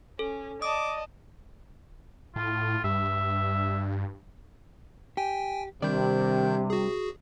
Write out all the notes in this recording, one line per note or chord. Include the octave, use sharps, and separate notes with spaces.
C#4 A4
D5 D#5 A5 D6 D#6
A2 F4
G2 E5
G4 G5 G#5
C3 D#3 G3 D4 D5 G6
F#4 G#4